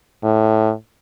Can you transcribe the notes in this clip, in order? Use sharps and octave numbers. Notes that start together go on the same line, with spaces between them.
A2